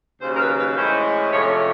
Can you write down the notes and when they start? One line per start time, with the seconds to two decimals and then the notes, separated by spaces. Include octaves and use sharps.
0.21 D#2 C#3 F#3 C5
0.35 A#4
0.39 B4
0.58 B4
0.76 A2 E3 G#3 C#4 C5
1.31 C3 F3 A3 C#4 C#5